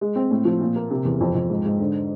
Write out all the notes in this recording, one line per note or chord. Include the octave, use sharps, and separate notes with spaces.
G#3
C4
A2
F3
A#2
A#3
C3
E2
F2
F2
G#2
G#2
D3